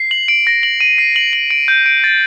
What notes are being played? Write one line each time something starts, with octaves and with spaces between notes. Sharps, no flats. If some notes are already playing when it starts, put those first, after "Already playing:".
Already playing: C7
F#7
D7
A#6
F#7
D#7
C7
F#7
F#7
D7
G6
D7
A6